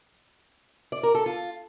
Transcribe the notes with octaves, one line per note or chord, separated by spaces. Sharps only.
D5
A#4
A4
F4